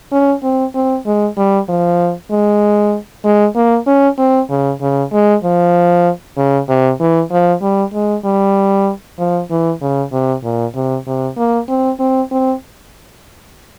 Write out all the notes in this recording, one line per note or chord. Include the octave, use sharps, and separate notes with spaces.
C#4
C4
C4
G#3
G3
F3
G#3
G#3
A#3
C#4
C4
C#3
C#3
G#3
F3
C#3
C3
E3
F3
G3
G#3
G3
F3
E3
C#3
C3
A#2
C3
C3
A#3
C4
C4
C4